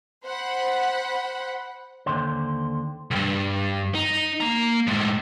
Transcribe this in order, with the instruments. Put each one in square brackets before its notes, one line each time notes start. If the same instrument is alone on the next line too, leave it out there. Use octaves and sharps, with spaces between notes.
[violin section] C5 F#5 B5
[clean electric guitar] D#2 B2 D3 C5
[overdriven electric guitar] C2 G2
D#4
A#3 A#5
A2 G#3